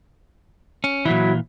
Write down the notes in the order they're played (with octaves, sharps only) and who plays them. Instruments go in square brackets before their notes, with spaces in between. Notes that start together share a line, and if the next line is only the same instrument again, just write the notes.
[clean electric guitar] C#4
[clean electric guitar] A#2 E3 [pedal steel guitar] F#3 E4